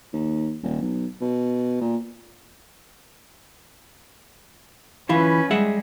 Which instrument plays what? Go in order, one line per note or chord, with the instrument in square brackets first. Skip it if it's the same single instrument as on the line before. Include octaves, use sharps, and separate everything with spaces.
[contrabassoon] D#2
D#1
B1
B2
A#2
[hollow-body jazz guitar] E3 E4 F4 [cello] C#4 B4
[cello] G3 G#3 [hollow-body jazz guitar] G#4 E5 F#5